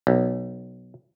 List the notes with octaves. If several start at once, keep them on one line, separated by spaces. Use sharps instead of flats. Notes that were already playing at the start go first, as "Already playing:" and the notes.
B1